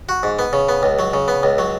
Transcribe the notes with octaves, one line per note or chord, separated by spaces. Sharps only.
F#4
G#2
B3
C#3
B3
C#2
F#3
C#3
B3
C#2
F#3